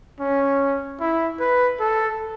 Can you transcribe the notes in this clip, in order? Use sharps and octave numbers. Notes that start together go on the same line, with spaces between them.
C#4
E4
B4
A4